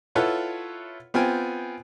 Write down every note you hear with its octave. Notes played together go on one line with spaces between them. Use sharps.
E4 F4 A4 B4 C#5 F#5
B3 C4 F4 G5 G#5